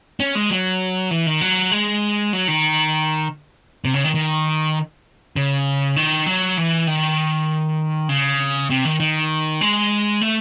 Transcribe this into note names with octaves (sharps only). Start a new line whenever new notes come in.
C#4
G#3
F#3
E3
D#3
F#3
G#3
F#3
D#3
C3
C#3
D#3
D#3
C#3
D#3
F#3
E3
D#3
C#3
C3
D#3
D#3
G#3
A3